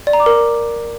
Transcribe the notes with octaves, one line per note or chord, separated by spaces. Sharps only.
D5
A#5
D6
A#4